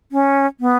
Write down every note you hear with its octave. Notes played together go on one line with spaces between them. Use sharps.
C#4
B3